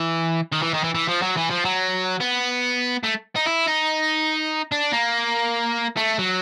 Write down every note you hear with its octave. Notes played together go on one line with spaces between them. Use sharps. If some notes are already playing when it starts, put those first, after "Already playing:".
Already playing: E3
D#3
E3
D#3
E3
E3
F3
F#3
E3
F3
F#3
B3
A3
D#4
E4
D#4
D4
A#3
A3
F#3